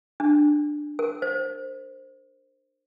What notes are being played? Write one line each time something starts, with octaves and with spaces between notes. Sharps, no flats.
D4
A#4
C5